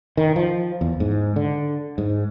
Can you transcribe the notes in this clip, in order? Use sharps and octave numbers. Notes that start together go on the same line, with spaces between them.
D#3
F3
E2
G#2
D3
G#2